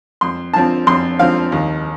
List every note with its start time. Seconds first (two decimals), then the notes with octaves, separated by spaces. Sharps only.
0.21 F2 C6
0.53 D3 F3 C4 A5
0.87 F2 C6
1.19 D3 F3 C4 F5
1.52 D#2